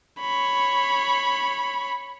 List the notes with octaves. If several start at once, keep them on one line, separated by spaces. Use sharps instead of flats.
C#5 B5